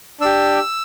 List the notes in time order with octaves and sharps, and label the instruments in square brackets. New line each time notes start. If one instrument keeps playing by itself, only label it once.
[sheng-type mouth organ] D4 G4 E6